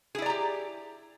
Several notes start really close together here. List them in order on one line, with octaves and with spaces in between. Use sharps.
G#4 E4 D5 A#5 G4